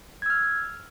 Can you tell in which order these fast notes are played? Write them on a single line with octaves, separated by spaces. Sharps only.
G#6 E6 F6